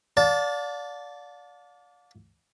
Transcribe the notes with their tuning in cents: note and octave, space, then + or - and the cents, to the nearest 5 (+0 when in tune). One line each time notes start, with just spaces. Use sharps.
D5 -20 F5 +40 A5 +0